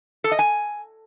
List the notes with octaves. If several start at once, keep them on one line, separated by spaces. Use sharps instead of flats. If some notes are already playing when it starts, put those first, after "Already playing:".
A4
D#5
G#5